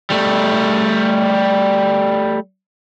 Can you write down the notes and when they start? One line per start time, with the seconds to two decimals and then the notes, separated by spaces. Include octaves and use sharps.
0.10 G3 A3